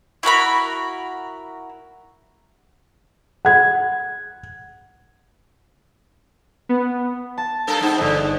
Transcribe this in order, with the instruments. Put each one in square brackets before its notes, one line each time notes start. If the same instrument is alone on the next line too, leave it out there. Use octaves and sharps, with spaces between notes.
[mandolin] E4 F#4 A#4 B5
[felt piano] F#5 G#6
[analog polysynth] B3
[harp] A5
[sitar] G2 A4 A#4
[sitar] G#2 C4 [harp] D#4
[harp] G1 D#5 [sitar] E2